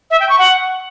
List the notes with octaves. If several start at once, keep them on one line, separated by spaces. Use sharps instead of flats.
E5
G5
C#6
F#5